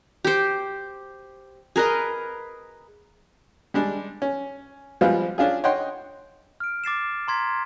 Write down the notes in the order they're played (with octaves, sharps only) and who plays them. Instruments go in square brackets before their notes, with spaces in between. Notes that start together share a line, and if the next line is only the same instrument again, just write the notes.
[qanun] G4 C5
G#4 A#4 B4 D#5
[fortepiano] G3 G#3 D4
C#4
F3 G3 G#3 B3 C4 F4
C#4 D4 F4 G#4
C#5 D#5 F#5 G5 C6
[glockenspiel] F6 D7
D6 A6 C7 E7
A#5 C6 G#6 B6